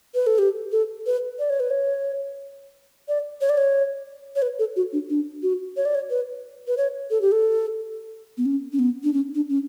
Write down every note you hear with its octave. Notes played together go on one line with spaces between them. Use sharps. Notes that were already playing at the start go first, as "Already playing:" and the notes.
B4
A4
G4
A4
B4
D5
C#5
B4
C#5
D5
C#5
D5
C#5
C#5
B4
A4
F#4
D4
D4
F#4
C#5
D5
C#5
B4
B4
C#5
A4
G4
A4
B3
C#4
C#4
B3
D4
C#4
D4
C#4